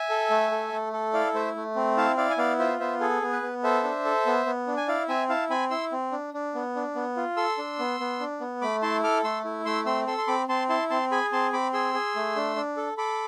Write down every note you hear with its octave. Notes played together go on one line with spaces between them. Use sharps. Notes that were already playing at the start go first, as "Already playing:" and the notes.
Already playing: E5 G#5
A4
A3
A4
A3
A4
E4 D5 F5
A3 C5 E5
A3
C4
E4 F5 A5
E4 D5 F5
G#5
B3 D5 F5
F4 C5 E5
B3 C5 E5
G#4 A4
B3
B4
B3
A4 C5 E5
D4
A4
B3
B3
D4
G#5
E4 D5 F5
C4 E5 G#5
E4 F5 A5
C4 G#5 B5
E4 C6 E6
C4
D4
D4
B3
D4
B3
F4
A4 C6 E6
D4
B3
B3
D4
B3
A3 B5 D6
E4 A5 C6
A4 D6 F6
A3 C6 E6
E4
A3 C6 E6
C4 C6 E6
A4 C6 E6
C6
C4 B5 D6
C4 A5 C6
E4 A5 C6
C4 A5 C6
G#4 G#5 B5
C4 A5 C6
C4 B5 D6
G#4 C6 E6
G#4
A3
D4
D4
A4
A4 B5 D6